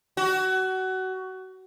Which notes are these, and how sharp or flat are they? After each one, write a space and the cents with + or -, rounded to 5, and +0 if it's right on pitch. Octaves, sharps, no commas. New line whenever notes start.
F#4 +25